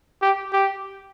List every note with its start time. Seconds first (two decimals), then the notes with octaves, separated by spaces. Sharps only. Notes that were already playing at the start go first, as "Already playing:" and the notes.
0.22 G4
0.53 G4